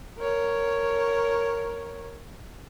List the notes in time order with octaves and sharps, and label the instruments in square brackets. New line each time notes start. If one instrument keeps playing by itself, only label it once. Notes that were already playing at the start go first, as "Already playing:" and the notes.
[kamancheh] A#4 C#5